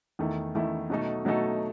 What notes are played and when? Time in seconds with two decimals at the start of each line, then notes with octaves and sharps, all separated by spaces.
0.19 E2 D#3 A3 E4
0.55 E2 D#3 A3 E4
0.90 B2 F#3 A3 D#4 A4
1.25 B2 F#3 A3 D#4 A4